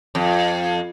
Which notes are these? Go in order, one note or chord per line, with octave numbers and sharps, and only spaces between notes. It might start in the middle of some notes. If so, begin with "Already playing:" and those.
F2